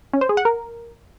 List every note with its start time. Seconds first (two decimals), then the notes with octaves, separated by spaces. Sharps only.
0.13 C#4
0.21 C5
0.29 G#4
0.37 F#5
0.45 A#4